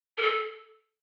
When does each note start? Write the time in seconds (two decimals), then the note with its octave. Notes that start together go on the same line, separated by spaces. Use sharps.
0.17 A#4
0.21 A4